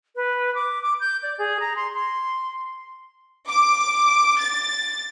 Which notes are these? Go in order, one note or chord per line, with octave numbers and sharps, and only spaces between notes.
B4
D6
D6
G6
D5
G#4
A#5
C6
C6
D6
A6